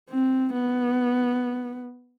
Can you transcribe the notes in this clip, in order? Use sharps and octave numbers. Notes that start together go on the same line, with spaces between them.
C4
B3